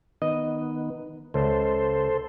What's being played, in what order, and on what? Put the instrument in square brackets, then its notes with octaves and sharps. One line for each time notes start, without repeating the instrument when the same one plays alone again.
[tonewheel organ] D#3 B3 [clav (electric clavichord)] D#5
[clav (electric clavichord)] C#2 [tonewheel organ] A4 C5